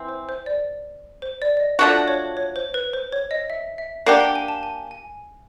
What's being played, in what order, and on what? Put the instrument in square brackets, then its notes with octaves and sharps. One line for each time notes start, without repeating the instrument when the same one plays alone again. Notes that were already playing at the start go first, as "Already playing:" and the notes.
Already playing: [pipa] E3 C4
[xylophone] C5
C5
D5
C5
D5
D5
D#5
[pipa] F3 A3 D4 F#4 [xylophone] D5
[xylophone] C#5
C#5
C5
B4
C5
C#5
D#5
E5
E5
[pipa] A#3 D4 G4 [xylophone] F#5
[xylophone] G5
G#5
A5
G#5
G#5